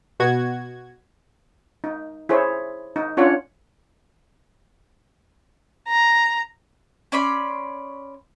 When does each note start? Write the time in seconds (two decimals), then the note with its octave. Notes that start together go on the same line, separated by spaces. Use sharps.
0.20 B2 F#4 G#6
1.84 D#4
2.29 E4 G#4 C5 C#5
2.96 D#4
3.17 C#4 D4 F4 C#5 F#5
5.88 A#5
7.12 C#4 D5 B5 C6